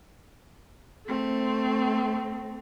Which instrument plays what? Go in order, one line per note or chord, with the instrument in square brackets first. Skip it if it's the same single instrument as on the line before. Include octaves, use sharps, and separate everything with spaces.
[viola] A3 C4